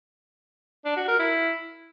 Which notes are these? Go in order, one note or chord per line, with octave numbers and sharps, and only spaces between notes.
D4
F#4
A#4
E4